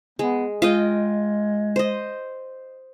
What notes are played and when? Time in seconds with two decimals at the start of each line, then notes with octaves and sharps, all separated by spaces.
0.19 G#3 B3
0.62 G#3 F4 D#5 G5
1.76 C5 D#5